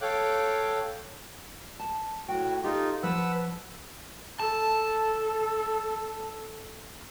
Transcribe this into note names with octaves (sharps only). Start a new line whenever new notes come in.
A4 C#5 F5 G5 D6 F#6
A5
A2 F#4 G5
D#4 F4 G4 A4 D#5
F3 B4 C5 F#5 E6
A4 A5